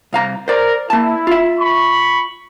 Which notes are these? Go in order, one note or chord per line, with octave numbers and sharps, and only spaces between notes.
C2 F5 A#5
A#4 C5 D5
A#3 E4 A5
F4 E5
B5 C#6